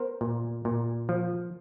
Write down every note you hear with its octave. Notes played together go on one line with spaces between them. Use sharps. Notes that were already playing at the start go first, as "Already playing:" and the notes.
Already playing: B3 A#4 C5
A#2
A#2
F3